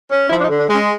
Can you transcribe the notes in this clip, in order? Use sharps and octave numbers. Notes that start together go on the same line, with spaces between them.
C#4
F3 E4
D4
D#4
D3
D4
G#3
C#4